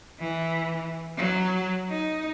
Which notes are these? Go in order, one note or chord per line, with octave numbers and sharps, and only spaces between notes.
E3
F#3
D#4